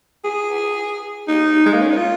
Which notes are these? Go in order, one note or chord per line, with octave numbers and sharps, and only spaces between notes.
G#4
D#4
G#3
A#3
C#4
D#4
F4